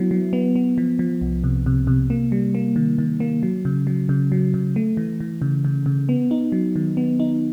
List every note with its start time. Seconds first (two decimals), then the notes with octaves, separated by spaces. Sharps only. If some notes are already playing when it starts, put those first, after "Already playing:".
Already playing: F#3 B3 E4
0.11 F#3
0.33 B3
0.56 B3
0.78 F3
0.99 F3
1.21 C2
1.44 C3
1.66 C3
1.87 C3
2.10 A#3
2.32 G3
2.55 A#3
2.76 D#3
2.98 D#3
3.20 A#3
3.43 F#3
3.65 C#3
3.87 F#3
4.09 C#3
4.32 F#3
4.54 C#3
4.76 A3
4.97 E3
5.20 E3
5.42 C#3
5.65 C#3
5.86 C#3
6.09 B3
6.31 D#4
6.52 F#3
6.76 D#3
6.97 B3
7.20 D#4